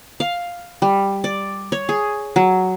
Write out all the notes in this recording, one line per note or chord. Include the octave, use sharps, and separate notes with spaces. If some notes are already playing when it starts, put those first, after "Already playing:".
F5
G3
D5
C#5
G#4
F#3